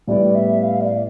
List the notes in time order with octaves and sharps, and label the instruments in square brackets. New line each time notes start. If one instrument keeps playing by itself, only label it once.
[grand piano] A2 G3 B3 E4 [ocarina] D5
[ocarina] E5
F5
D5